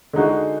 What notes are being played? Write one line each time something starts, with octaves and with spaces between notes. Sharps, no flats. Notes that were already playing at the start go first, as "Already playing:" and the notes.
D3 G#3 D#4 F#4